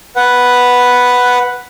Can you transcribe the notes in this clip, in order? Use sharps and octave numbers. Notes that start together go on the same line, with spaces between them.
B4 F#5